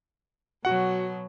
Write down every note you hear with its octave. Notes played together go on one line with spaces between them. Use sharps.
B2 F#3 F#4 F#5